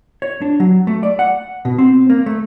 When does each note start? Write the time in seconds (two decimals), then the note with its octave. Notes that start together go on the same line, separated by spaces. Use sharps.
0.22 C#5
0.42 D4
0.60 F#3
0.87 A3
1.03 D5
1.19 F#5
1.65 B2
1.78 C4
2.10 A#3
2.26 A3